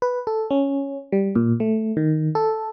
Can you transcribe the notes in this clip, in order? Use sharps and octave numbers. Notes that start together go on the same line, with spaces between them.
B4
A4
C#4
G3
A#2
A3
D#3
A4